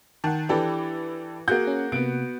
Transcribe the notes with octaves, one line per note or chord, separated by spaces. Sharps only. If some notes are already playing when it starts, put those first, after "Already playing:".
D#3 F#5 A5
E3 D4 G4 A4 B4
A#3 F#4 G#4 G6
C#4
C3 A#3 B3 D7